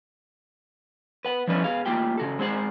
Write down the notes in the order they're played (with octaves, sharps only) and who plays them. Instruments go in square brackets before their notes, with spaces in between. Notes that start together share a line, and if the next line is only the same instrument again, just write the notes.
[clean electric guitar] B4 F#5
F3 G3 C#4 E4 B4
B3 G#4 F5
A3 A#3 F4 G4 G5
C#3 F#4 A4
G#3 C4 G#4 C5 F#5